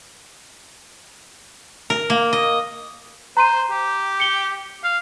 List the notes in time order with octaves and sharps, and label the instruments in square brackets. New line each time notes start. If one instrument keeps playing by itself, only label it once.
[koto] A#4
A#3
D#5
[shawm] C5 [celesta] A#5 C6 D#7
[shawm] G4
[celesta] C#7 G7
[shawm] F5